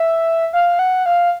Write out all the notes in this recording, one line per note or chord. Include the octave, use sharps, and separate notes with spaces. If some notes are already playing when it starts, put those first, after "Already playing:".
Already playing: E5
F5
F#5
F5